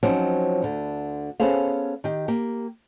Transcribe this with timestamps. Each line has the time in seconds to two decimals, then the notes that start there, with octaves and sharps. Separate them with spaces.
0.03 F3 F#3 C4 C#4 D#4
0.62 D2 D3
1.40 B3 C#4 G#4 A4 C5 F5
2.04 D#3 G4
2.28 A#3 G4